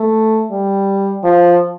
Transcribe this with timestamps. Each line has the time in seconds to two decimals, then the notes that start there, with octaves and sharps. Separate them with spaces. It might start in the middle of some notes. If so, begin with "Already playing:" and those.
Already playing: A3
0.51 G3
1.24 F3